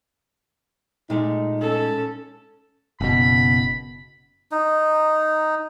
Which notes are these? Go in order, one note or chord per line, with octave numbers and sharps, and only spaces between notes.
A#2 G#3 A3 D#4
C#4 A4
F#1 B2 B5
D#4